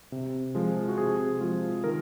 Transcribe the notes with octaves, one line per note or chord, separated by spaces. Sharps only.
C3
F3 G#3
F#4
C3 G#4
F3 G#3 F4
D#3 A#4